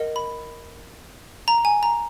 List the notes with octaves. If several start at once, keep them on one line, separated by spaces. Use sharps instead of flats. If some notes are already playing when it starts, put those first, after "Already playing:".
Already playing: A#4 D#5 F#5
B5
A#5
G#5
A#5